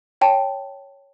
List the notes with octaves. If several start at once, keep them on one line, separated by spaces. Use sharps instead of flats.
C#5 G5 A5